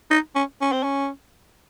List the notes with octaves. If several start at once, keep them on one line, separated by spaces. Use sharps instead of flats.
D#4
C#4
C#4
C4
C#4